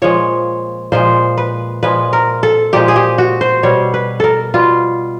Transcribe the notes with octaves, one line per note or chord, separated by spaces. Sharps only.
A#2 F3 G#3 C#5
A#2 F3 G#3 C5
B4
A#2 F3 G#3 B4
A#4
A4
A#2 F3 G#3 G4
G#4
G4
F#4
C5
B2 G3 C#5
B4
A4 A#4
B2 G3 F4